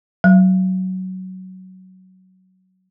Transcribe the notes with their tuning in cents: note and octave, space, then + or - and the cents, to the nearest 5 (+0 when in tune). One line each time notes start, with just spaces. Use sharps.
F#3 +15